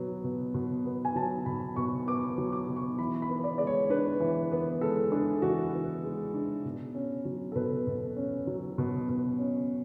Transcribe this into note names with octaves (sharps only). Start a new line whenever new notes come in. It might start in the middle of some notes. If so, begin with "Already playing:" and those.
Already playing: B2 F#3 B3
B2
B2
B3
G#5
F#3 A5
B2 B5
B2 C#6
B3 D6
F#3
D6
B2
C#6
E3 B5
B5
B3
D5
G#3 D5
C#5
D4 B4
E3
B3
G#3 A4
D4 G#4
E3 F#4
B3
G#3
D4
B2
C#4
F#3
A4
B2 B4
B2
C#4
F#3
B2
B2
C#4